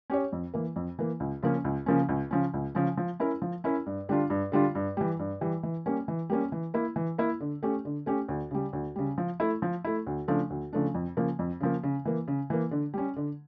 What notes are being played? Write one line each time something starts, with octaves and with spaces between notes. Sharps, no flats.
C#4 G4 C#5
F2
E3 A#3
F2
E3 A#3
C#2
C#3 F3 A#3 C#4
C#2
C#3 F3 A#3 C#4
C#2
C#3 F3 C#4
C#2
C#3 F3 C#4
F3
C#4 E4 A#4
F3
C#4 E4 A#4
G2
D3 G3 D4 F4
G2
D3 G3 D4 F4
G2
E3 G3
G2
E3 G3
E3
G3 A#3 C#4
E3
G3 A#3 C#4
E3
A#3 E4
E3
A#3 E4
D3
A3 C#4 G4
D3
A3 C#4 G4
D2
C#3 G3
D2
C#3 G3
F3
A3 E4
F3
A3 E4
D2
C#3 F3 A3 D4
D2
C#3 F3 A3 D4
F2
C#3 F3 A#3
F2
C#3 F3 A#3
C#3
E3 A#3
C#3
E3 A#3
D3
G3 C#4
D3